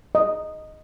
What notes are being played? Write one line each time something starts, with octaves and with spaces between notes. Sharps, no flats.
D#5